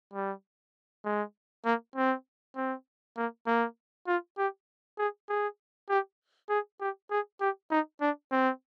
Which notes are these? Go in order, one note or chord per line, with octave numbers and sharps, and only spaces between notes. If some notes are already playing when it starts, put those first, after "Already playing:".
G3
G#3
A#3
C4
C4
A#3
A#3
F4
G4
G#4
G#4
G4
G#4
G4
G#4
G4
D#4
D4
C4